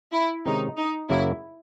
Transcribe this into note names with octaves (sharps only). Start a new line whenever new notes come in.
E4
C3 D#3 G#3 C#4 D#4
D#4
F#2 C#3 F#3 A#3 E4